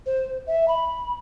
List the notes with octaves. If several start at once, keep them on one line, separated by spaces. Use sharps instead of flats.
C5
E5
B5